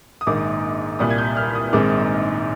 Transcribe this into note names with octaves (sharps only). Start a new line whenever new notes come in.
D#6
A#1 G#2 D#3 A#3 D6
C2 A#2 G3 D#6
G#6
G6
F6
D#6
A#1 G#2 D#3 G#3 C4 D6